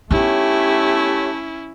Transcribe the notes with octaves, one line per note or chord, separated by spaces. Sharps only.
A3 B3 C#4 D#4 E4 G4 C#5